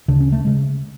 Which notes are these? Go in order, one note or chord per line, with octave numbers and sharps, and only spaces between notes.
D2 C#3 D4
C#4
A3
C#3 G#3